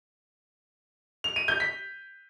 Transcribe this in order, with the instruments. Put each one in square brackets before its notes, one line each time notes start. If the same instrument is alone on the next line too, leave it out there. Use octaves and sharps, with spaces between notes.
[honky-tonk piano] F7
D#7
G6
B6